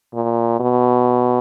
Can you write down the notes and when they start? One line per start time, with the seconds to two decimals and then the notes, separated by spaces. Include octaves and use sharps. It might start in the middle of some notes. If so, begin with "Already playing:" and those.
0.14 A#2
0.60 B2